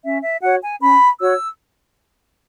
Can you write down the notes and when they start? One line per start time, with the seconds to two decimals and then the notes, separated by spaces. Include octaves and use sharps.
0.03 C#4 E5
0.22 E5
0.42 F#4 C#5 F#5
0.61 G#5
0.80 C#4 B5
1.19 F#4 C#5 E6